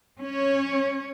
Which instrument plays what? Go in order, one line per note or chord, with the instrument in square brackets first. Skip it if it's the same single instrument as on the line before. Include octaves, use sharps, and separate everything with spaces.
[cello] C#4 C#5